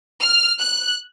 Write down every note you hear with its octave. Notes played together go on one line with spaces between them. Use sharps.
F6
F#6